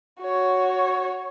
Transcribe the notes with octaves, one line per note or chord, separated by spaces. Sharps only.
F#4 C#5